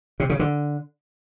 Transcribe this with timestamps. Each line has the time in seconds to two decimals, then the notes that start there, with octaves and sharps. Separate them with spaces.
0.20 C3
0.30 C#3
0.39 D3